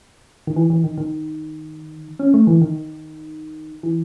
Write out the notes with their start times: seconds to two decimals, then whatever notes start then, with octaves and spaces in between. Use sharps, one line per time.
0.47 D#3
0.56 E3
0.70 E3
0.84 D#3
0.98 D#3
2.19 C#4
2.34 A3
2.47 E3
2.61 D#3
3.83 E3